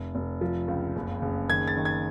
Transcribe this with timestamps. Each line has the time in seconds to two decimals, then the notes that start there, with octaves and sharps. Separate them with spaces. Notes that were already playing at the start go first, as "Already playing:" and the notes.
Already playing: F1
0.15 F1
0.41 F3
0.68 C#2
0.96 F#1
1.22 F#1
1.49 D#3 G#6
1.68 A6
1.77 D#3
1.85 G#6